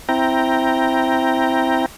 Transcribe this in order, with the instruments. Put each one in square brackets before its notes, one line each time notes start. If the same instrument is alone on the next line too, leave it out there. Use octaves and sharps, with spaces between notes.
[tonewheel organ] C4 E4 G5 A#5